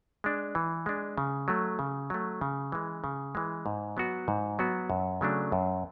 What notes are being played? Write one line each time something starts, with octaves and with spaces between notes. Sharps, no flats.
G#3 D4
E3
G#3 D4
C#3
F#3 A3
C#3
F#3 A3
C#3
E3 G#3
C#3
E3 G#3
G#2
F#3 B3 F#4
G#2
F#3 B3 F#4
F#2
C#3 F#3 A3 D4
F#2